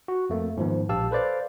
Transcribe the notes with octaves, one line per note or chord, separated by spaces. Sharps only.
F#4
F2 A3 A#3
G#2 D#3 F3 B3
A#1 G4 F5 A5 E6
A4 B4 C5 D5 F5